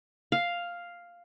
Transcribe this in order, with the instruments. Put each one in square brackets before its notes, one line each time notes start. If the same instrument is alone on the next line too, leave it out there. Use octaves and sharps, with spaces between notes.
[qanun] F5